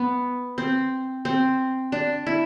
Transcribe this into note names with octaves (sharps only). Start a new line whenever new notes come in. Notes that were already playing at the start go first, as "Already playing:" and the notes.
Already playing: B3
C4
C4
D4
E4